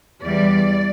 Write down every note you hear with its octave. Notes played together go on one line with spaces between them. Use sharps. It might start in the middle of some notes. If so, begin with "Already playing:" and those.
E2 E3 G3 D5